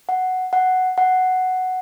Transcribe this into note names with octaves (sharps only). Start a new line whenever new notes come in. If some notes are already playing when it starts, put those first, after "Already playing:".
F#5
F#5
F#5